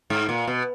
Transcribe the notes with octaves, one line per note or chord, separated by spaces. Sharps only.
G#2
A#2
B2